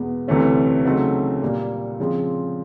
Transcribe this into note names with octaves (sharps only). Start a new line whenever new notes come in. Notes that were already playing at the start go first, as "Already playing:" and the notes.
Already playing: E2 B2 G#3 B3
D2 C3 E3 A3 C#4
C#3 F#3 A3 C4 D#4
A#2 G3 A#3
C#3 F3 G#3 C4